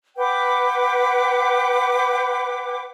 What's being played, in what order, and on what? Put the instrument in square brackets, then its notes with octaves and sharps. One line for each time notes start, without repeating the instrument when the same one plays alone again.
[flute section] B4 F#5 G5 D6